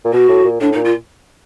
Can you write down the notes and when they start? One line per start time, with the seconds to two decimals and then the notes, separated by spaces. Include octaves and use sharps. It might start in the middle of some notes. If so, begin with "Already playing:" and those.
0.05 A#2
0.13 B2 F#4
0.29 A2
0.44 A#2
0.60 A2 D4
0.72 D#4
0.76 A#2
0.84 F4